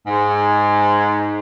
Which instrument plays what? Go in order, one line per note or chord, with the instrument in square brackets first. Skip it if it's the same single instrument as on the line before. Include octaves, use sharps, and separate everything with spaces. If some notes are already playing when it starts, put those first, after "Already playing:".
[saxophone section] G#2